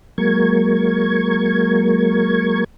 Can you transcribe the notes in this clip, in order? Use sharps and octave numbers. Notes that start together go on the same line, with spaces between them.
F#3 G#3 A#3 A#4 C#6 G#6